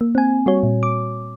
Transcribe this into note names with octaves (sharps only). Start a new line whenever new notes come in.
A#3
C4 G#5
G3 F#4 C#5
A#2
D6